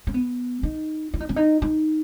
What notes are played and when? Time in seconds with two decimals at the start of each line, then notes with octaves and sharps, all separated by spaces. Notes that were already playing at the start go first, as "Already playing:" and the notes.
0.07 C#4
0.14 B3
0.63 D#4
1.14 E4
1.20 D#4
1.29 C#4
1.36 D#4
1.62 D#4